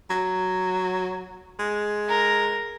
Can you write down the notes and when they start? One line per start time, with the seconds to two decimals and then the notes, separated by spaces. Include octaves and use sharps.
0.10 F#3
1.59 G#3
2.08 A#4